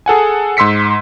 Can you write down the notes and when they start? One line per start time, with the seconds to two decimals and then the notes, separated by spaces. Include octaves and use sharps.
0.06 G#4 A4 F#5 G#5
0.57 G#2 C6 E6 B6 C#7